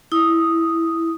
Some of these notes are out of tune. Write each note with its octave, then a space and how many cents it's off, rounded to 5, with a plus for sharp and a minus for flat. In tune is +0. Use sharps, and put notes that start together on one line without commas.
E4 +0 D#6 +0